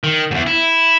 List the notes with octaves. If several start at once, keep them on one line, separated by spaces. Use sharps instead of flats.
D#3
E2 G#2
E4